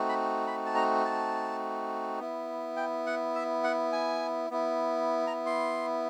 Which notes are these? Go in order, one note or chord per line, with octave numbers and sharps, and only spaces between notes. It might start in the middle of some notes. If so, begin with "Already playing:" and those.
Already playing: A3 C4 D#4 F#4
B5
B5
A5
A#5
A5
B3 E4
G5
F#5
E5
F#5
G#5
B3 E4
A#5
C6